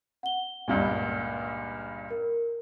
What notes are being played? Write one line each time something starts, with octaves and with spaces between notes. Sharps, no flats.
F#5 G7
C#2 G2 A#2
A#4